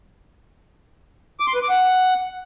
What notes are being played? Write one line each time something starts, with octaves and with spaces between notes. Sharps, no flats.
D6
C6
B4
D6
F#5